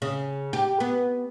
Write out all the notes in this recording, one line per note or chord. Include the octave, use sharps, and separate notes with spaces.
C#3
G4
B3